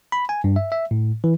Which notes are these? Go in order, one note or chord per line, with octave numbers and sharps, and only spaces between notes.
B5
G#5
G2
E5
E5
A2
E3